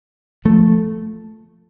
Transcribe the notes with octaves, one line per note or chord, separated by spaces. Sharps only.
F3 A3